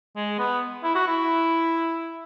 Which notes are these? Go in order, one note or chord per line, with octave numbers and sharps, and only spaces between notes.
G#3
B3
E4
F#4
E4